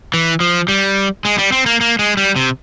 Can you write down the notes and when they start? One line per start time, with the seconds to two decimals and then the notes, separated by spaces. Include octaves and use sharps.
0.14 E3
0.40 F3
0.68 G3
1.25 G#3
1.38 G3
1.52 C4
1.66 A#3
1.81 A#3
1.99 G#3
2.17 G3
2.36 C3